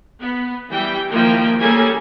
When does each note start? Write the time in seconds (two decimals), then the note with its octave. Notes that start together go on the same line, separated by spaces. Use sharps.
0.22 B3
0.70 E3 G3 G5
1.10 D#3 F3 A#3 E4 G5
1.60 G3 A#3 C#4 G#4 A4 G#5